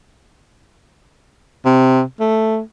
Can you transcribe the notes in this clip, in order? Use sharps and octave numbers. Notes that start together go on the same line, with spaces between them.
C3
A3